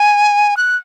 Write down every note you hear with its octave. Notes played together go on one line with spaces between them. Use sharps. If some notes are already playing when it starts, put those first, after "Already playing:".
Already playing: G#5
F#6